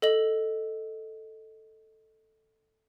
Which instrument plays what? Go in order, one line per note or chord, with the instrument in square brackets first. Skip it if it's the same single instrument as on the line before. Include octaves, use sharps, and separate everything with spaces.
[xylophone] A4 D#5 F#7